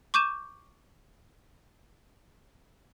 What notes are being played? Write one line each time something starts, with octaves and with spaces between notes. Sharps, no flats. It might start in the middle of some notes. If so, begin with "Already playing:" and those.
C#6 D6 G6 D#7 E7